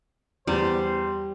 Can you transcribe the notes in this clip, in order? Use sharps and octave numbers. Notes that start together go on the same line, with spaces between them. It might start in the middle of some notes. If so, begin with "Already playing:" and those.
E2 G3 C5